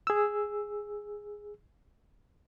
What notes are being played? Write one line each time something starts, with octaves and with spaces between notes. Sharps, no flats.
G#4 E6